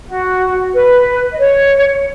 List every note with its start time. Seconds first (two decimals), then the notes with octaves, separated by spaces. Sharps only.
0.07 F#4
0.74 B4
1.32 D#5
1.39 C#5